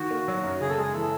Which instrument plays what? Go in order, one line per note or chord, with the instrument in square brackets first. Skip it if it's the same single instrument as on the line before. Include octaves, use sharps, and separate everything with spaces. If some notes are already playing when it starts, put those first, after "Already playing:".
Already playing: [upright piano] D#3 [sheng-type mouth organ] F#4
[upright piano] A#3
F#3
F#2
[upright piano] C#3 [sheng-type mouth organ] G#4
[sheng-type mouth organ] A4
[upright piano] G#3 [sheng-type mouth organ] G#4
[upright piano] E3 [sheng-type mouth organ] A4